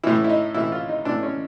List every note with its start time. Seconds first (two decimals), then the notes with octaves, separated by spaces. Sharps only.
0.03 A2 E3 E4
0.24 E4
0.30 D#4
0.54 A2 E3 E4
0.72 F4
0.89 D#4
1.05 A2 E3 D4
1.23 C#4